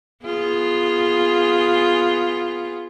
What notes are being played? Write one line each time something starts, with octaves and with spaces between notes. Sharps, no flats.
B3 F4 G#4